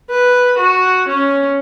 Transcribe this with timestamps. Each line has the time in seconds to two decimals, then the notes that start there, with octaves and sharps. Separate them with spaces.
0.10 B4
0.58 F#4
1.08 C#4